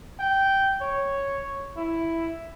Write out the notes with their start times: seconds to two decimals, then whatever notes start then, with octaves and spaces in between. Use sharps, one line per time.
0.19 G5
0.81 C#5
1.77 E4